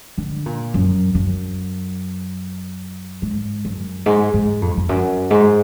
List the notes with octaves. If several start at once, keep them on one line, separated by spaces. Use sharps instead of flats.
D3
A#2
F#2
F#2
G#2
F#2
G#2
G#2
F2
F2
F#2
G#2